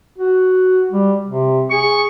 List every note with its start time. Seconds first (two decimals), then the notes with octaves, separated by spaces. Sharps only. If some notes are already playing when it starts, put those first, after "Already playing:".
0.18 F#4
0.91 G3
1.25 C3
1.71 G#4 C#6